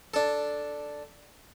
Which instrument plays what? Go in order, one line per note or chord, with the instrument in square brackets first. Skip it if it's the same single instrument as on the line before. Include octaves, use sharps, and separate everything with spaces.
[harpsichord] D4 A4